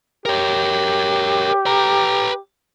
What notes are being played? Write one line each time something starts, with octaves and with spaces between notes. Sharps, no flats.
G4 A#4 C#5
B4 A#5